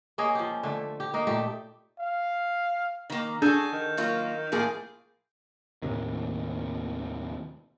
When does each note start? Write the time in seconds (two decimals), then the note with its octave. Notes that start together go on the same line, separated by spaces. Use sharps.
0.18 A#3 C#4 G#4 D#5
0.35 F3 G4
0.63 D3 A3
1.00 G4
1.14 A#3 D#4 A#4
1.27 A#2 A3 G4 G5
1.99 F5
3.10 D#3 A#3
3.42 D4 F#4 G#4 A4 G6
3.73 D#3
3.97 F#3 A#3 F4
4.52 A2 F3 A#3 G#4
5.82 D#2 A2 C3 D#3